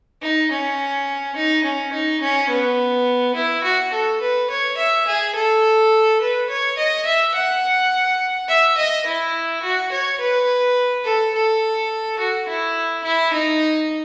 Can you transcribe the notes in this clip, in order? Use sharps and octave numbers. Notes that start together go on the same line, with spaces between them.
D#4
C#4
D#4
C#4
D#4
C#4
B3
E4
F#4
A4
B4
C#5
E5
G#4
A4
B4
C#5
D#5
E5
F#5
E5
D#5
E4
F#4
C#5
B4
A4
A4
F#4
E4
E4
D#4